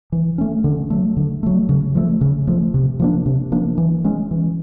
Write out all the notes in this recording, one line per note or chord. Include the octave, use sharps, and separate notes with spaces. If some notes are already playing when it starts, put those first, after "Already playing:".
E3
A3 C#4
D3
F#3 A3
D3
F#3 A3
C#3
F3 A3
C#3
F3 A3
C3
F3 A#3 D4
C3
F3 A#3 D4
E3
G#3 C#4
E3